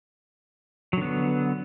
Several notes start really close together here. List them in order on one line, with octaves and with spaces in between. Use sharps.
F#3 D3 B3